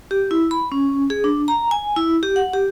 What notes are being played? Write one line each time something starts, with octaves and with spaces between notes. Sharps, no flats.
G4
E4
B5
C#4
G#4
D4
A#5
G#5
E4
G4
F#5
G4